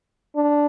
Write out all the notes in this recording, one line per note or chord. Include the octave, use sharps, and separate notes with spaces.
D4